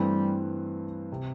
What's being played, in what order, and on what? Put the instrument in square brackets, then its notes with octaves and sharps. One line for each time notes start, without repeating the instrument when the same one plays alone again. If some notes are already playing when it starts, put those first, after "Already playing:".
Already playing: [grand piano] G2 E3 A3 C4 [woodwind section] G3
[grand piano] C3